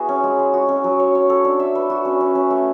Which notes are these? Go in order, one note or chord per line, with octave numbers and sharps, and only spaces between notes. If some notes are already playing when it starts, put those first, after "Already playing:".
Already playing: B3 E4 F#4 G#4
C#4
G#3
G#3
F#4
C#4
F#3
C#5
C#5
A4
D4
E5
B4
F#4
C#4
C#4
C#4
A3